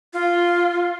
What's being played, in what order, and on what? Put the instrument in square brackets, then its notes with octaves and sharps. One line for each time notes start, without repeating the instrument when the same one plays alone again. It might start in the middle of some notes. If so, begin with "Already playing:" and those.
[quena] F4